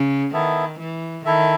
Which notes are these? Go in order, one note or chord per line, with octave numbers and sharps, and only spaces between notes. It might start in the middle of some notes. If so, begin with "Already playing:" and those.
Already playing: C#3
D#3 B3 E4 A4 E5
E3
D#3 E4 A4 E5